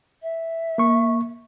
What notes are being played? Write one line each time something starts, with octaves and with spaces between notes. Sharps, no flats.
E5
A#3 C#6